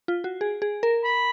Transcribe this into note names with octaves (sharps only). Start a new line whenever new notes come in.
F4
F#4
G#4
G#4
A#4
B5